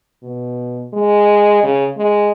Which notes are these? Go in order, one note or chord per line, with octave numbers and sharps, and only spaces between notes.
B2
G#3
C#3
G#3